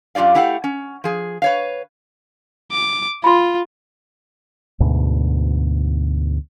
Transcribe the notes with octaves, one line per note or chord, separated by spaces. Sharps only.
F#2 F4 G4 D5 F5
A3 E4 G4 F5 F#5
C#4
F3 G#4
B4 C#5 F5
D6
F4 B5 C6
D2 G#2 B2